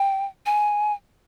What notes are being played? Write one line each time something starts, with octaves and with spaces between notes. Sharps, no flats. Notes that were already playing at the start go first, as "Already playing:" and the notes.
Already playing: G5
G#5